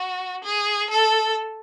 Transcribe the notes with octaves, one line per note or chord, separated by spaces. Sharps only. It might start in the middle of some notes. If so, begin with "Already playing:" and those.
Already playing: F#4
G#4
A4